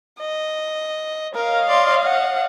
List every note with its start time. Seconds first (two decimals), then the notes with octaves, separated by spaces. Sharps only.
0.20 D#5
1.35 A#4 C#5 D#5 F5
1.68 D5 C6
2.04 F#5